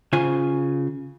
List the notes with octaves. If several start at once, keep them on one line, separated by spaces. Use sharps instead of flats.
C#3 F4 C5 G#5